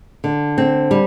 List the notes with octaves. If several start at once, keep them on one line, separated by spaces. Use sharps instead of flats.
D3
C4
G3